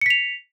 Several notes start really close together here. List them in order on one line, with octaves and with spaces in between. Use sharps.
C#7 B6 F7